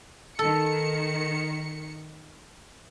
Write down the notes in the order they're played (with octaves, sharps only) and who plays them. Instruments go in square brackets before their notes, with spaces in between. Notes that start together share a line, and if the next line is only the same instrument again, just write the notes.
[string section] D#3 C#7 [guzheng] A4